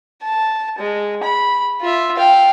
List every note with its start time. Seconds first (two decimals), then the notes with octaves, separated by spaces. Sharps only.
0.22 A5
0.79 G#3
1.23 B5
1.81 F4 E5
2.17 F5 G5